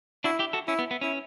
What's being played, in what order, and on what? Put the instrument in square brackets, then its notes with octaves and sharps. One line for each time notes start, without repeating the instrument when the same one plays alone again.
[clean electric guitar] D4 F#4 [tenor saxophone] E4
[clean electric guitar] E4 G4
F#4 A4
[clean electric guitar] C#4 [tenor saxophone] E4
[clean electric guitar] B3
B3
[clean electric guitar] C#4 [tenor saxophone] E4